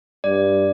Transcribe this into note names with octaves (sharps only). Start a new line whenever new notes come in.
G2 D5